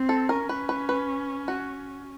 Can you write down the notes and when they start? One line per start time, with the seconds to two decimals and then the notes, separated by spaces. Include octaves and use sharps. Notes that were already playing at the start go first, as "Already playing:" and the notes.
Already playing: C4
0.09 A4
0.29 C#4 A#4
0.49 B4
0.69 B4
0.89 B4
1.48 F#4